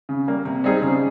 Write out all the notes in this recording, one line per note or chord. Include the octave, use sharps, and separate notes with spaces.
C#3
G3 A#3
C3
G3 C4 D#4 G#4
C#3